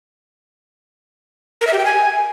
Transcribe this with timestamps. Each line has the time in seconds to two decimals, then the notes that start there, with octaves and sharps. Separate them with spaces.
1.61 A#4
1.67 E5
1.73 G4
1.79 G5
1.85 G#5